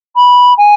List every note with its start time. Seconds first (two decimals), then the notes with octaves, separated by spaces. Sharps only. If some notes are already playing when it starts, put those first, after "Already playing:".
0.16 B5
0.58 G#5